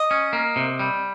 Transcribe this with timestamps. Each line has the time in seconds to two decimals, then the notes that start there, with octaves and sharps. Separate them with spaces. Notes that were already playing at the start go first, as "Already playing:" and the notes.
Already playing: D#5
0.11 C#4
0.33 A#3
0.56 C3
0.79 G3